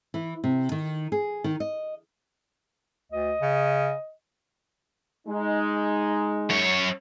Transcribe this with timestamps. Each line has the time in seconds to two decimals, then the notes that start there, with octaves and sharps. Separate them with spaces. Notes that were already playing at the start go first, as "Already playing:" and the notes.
0.14 E3
0.44 C3
0.72 D#3
1.12 G#4
1.44 D#3
1.60 D#5
3.12 D2 D#5
3.41 C#3
5.28 G#3 D#4
6.50 F#2 C#5